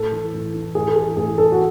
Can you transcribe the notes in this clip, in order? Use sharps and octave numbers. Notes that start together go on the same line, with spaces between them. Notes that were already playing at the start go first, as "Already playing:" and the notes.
Already playing: A2 A4
E3
A2
E3
A2 G#4
A4
E3 G#4
A2 G#4
E3 A4
F#4